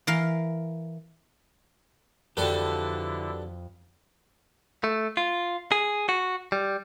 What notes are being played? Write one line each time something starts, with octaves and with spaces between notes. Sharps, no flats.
E3 A#4 F5
F2 D3 D4 E4 F#4 G4 A4 B4
A3
F4
G#4
F#4
G3